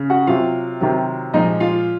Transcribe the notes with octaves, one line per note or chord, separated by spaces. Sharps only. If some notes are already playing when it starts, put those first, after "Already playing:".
Already playing: C#3
F#4 F#5
C3 F#3 F4 F5
C3 D#3 F#3
A#2 F3 G#3 D#4 D#5
F4 F5